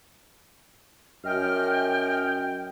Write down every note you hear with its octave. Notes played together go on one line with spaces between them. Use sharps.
F#2 D#5 G5 F6